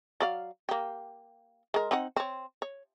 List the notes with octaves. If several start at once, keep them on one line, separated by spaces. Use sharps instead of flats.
F#3 D5 F5
A#3 G4
G#3 A#4
C4 D#4 F#5
C4 C#5
C#5